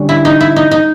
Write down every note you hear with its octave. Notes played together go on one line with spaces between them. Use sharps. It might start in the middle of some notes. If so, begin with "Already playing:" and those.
Already playing: D3 G3 C#4
E4
D#4
E4
D#4
D#4